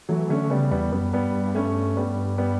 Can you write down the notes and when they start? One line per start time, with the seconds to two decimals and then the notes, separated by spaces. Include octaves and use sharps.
0.09 E3 F#3 A3
0.30 D3 A3 C#4
0.50 C#3 G3 B3
0.71 E2 G3 B3
0.92 F#2 G3 B3
1.13 G2 G3 B3
1.54 A3 C#4
1.97 G3 B3
2.38 G3 B3